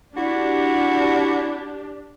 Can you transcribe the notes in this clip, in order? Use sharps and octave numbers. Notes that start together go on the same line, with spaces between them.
D4 E4 F#4 G4